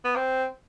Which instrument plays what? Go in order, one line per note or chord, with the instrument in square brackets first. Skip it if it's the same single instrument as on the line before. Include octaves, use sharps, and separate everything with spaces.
[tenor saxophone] B3
C4